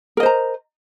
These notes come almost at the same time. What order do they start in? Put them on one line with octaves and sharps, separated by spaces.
A#4 D#5 C5 A#5